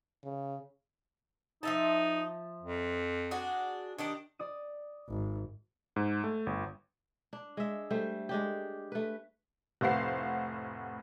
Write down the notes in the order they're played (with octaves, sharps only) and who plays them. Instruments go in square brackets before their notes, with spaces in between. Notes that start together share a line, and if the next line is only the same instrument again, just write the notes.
[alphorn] C#3
[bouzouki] F3 E5 A5 [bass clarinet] D#4
[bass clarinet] F2
[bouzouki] D4 F#4 G#4
[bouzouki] D#3 G4 D#5 [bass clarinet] D4
[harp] D5 D#6 D#7
[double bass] G#1
[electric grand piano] G#2
A3
G1
[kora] D4
G#3 E5
G3 A3 C5
G#3 D4 G4
A3 B4
[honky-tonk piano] F1 A2 C5 F5 F#5 C7